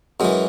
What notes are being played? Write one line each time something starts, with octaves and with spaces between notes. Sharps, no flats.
F#2 E3 G#3